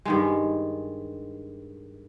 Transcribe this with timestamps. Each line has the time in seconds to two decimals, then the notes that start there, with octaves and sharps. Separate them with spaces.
0.05 G2 D#3 G#3